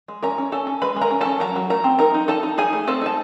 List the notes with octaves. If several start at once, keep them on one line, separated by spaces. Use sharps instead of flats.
G#3
C#4 A#4 A#5
C#4
C#4 A4 A5
C#4
G#3 B4 B5
G#3
A#4 A#5
C#4
C#4 A4 A5
F#3 A#4 A#5
F#3
A3 A#4 A#5
C4
D#4 A#4 A#5
D#4
D#4 A4 A5
D#4
D#4 G#4 G#5
A3
C4 A4 A5
D#4 A5